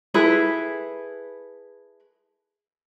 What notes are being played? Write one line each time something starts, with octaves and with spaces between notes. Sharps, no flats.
E4 G#4 A4 B4